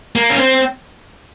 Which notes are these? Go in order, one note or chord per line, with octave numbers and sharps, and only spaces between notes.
A#3
C#4
C4